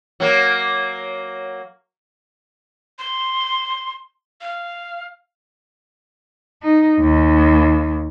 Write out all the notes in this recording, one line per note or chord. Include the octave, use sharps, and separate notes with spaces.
F#3 A#3
C6
F5
D#4
D#2